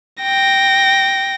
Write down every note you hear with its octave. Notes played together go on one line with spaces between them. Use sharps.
G5 A#6